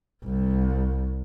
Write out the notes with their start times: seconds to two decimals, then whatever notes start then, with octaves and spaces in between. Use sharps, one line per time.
0.24 C2